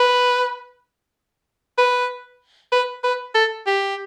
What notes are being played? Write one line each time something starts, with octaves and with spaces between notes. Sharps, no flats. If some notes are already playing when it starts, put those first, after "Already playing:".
Already playing: B4
B4
B4
B4
A4
G4